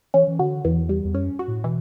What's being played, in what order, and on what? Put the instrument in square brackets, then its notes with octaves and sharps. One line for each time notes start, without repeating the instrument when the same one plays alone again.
[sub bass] E3 [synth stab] C#4
[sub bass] E3
[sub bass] D3 [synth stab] F#4
[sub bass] E2 [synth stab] E3
[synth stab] G3
[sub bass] E2
[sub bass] F#2 [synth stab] C#4
[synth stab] F#4
[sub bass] A2
[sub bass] B2 [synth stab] E3